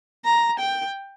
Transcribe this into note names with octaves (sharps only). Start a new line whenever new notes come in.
A#5
G5